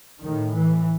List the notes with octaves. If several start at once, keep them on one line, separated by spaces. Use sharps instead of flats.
A2 D#3
E3